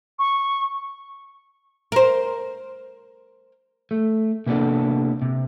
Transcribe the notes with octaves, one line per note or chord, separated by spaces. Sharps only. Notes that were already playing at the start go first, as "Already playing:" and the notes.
C#6
A#4 C5
A3
C3 A#3 B3 D4 A4
C3